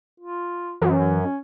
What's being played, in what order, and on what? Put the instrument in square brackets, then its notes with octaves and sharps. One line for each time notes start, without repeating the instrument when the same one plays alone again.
[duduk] F4
[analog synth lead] F#2 [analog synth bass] E3
[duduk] C#4